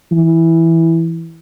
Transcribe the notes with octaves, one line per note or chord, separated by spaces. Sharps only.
E3